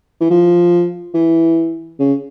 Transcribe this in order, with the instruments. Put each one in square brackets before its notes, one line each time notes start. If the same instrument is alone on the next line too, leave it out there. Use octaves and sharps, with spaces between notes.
[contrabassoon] E3
F3
E3
C#3